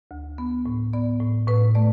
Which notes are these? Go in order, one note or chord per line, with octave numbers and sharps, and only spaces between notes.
D2
B3
A2
B3 D5
A2
A2 B4
A3 D5